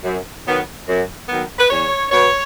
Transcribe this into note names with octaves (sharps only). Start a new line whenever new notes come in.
F#2
D#3 F#3 B3
F#2
D#3 F#3 B3
B4
E2 C#5
B2 F#3 B3 C#5